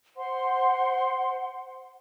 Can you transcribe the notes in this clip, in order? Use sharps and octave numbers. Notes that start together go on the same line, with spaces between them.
C5 F#5 C6